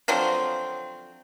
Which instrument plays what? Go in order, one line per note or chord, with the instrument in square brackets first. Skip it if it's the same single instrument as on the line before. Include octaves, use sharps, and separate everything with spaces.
[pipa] D3 F3 F#3 C4